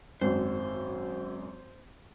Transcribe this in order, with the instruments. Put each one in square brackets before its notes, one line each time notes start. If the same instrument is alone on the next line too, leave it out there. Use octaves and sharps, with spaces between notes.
[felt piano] G#1 F#2 [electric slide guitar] C5